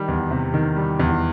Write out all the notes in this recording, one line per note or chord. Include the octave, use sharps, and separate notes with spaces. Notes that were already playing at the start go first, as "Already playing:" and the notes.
Already playing: D#3 G3
E2
C3
D#3
G3
E2